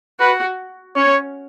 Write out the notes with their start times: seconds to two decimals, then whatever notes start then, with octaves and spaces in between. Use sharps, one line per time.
0.20 F#4 B4
0.96 C#4 C#5